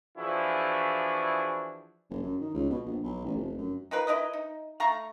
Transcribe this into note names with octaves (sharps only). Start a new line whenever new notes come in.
E3 F3 D4 E4 F#4 G#4
F#1
F#2
D#3
C#2
B2
A#1
B1
A1
F1
F#2
D#4 F4 A#4 B4
E4 A#4 B4 D#5
D#4
A3 F5 A#5 C#6